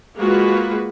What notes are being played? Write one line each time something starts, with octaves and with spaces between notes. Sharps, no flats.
G#3 A#3 F4 F#4 B4